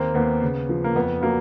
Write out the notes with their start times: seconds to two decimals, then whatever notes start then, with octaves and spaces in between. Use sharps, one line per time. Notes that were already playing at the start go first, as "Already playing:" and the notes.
Already playing: D#2 A#3 C4
0.14 D#2 B3
0.42 C#3
0.69 F3
0.84 A#3
0.95 F2 B3
1.22 F#3 A#3